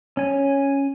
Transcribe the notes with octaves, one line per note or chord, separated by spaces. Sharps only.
C#4 G#5